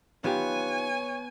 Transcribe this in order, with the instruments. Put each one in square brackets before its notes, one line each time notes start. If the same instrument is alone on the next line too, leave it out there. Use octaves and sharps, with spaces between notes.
[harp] B3 [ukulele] D#4 F4 G4 [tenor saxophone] C#5 [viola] G#5